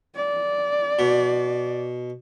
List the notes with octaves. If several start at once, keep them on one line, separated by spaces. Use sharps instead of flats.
D5
B2